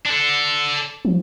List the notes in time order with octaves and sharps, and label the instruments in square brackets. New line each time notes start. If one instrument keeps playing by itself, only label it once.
[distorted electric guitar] D4 A4
[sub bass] F3